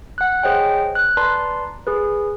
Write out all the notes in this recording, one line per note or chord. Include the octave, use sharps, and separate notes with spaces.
F#5 F#6
G#4 C5 C#5 D#5 G5
F#6
B4 D5 A5 A#5 C6
G#4 B4